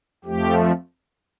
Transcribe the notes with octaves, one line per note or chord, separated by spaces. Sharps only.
F2 F3 A3 G4